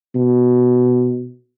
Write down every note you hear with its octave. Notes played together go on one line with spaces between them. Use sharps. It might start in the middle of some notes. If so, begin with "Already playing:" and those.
B2